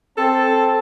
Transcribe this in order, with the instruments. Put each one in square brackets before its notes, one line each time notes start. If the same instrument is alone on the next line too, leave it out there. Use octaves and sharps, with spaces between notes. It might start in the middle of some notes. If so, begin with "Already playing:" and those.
[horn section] C4 A5 [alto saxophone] A4